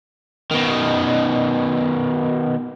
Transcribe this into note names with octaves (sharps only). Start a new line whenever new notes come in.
B2 D#3